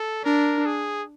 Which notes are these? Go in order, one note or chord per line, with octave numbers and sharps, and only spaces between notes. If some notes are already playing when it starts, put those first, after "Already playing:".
Already playing: A4
D4 A#4
G#4